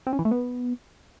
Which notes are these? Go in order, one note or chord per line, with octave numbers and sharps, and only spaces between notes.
C4
C#4
E3
A3
B3